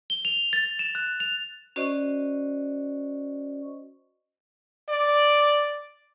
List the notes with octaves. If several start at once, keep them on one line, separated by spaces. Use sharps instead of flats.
G7
F7
A6
E7
F#6
F7
C#4 F#4 C5 D5 D#5 C#6
D5